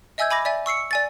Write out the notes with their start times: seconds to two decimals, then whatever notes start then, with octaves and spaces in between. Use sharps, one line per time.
0.18 D#5 E5 G#5 E6 G6 G#6
0.31 G#5 B5 D6 A#6
0.45 D5 E5 G#5
0.66 C#6 E6 C7 C#7
0.91 D5 G#5 A6